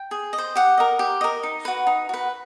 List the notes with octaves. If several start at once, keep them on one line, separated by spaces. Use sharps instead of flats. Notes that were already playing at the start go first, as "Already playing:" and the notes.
Already playing: G5
G#4
D#5
C5
G4 F#5
A#4 D#5
G4
A#4 D#5
D#4
F#4 B4
D#4
F#4 B4